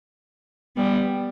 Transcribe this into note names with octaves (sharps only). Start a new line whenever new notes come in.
G3 B3